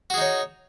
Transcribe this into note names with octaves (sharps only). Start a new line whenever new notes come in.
D#4 F#4 G#4 C#5